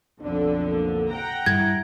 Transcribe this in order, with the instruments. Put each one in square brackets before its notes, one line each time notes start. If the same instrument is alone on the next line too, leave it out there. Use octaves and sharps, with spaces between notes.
[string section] B1 F2 D3 [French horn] D4
[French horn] A#3
[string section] F#5 G5 A#5
[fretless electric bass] G2 [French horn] E4 [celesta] G#6